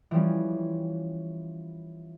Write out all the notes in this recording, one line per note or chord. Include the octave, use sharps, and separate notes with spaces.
E3 F3 G3 C#4